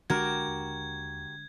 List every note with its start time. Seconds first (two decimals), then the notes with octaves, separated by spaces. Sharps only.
0.10 B1 D3 G#3 D4 F#4 G4 A#4 G#6
0.48 D#2